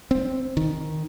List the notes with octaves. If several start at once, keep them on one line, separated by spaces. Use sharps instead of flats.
C4
D#3